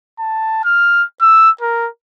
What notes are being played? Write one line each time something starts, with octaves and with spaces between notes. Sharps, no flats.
A5
F6
E6
A#4